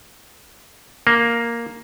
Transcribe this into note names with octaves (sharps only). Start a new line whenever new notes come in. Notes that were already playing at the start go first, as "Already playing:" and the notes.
A#3